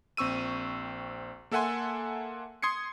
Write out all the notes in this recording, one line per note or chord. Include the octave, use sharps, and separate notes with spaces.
A#1 C4 C#6 E6 D#7
A#3 A4 E5 F#5 G#5 C6
C6 D#6 G#6 C7 C#7